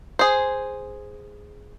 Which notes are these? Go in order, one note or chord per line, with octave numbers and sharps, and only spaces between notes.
G#4 C5